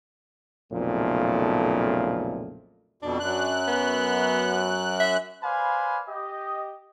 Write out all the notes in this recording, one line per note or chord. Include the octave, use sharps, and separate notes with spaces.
B1 F2 A#2 C#3 A3
F2 B2 D4
F#2 F#6
B3
E5
B4 C5 D5 F5 G#5 B5
G4 D#5